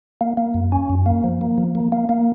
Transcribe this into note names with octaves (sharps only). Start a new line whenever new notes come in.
A#3
A#3
F#2
C#4
F#2
A#3
F3
A#3
F3
A#3
A#3
A#3